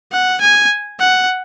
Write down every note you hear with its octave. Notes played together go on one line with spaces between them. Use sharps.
F#5
G#5
F#5